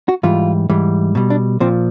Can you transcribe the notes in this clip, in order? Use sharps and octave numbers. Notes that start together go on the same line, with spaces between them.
F#4
G#2 E3 G3 F4
G#2 E3 G3
B2 G3
D4
A#2 F3 C4